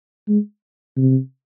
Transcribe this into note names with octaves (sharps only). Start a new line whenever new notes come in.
G#3
C3